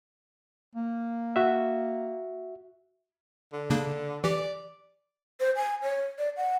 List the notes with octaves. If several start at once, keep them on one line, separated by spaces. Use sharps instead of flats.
A#3
F#4 E5
D3
C#3 A#3 D4
E3 G4 D5
C5
G#5
C#5
D5
F#5